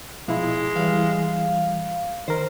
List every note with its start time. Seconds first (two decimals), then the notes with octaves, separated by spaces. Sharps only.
0.28 B2 F3 G#3 E4
0.76 E3 G3 F5
2.28 D#3 A#4 C5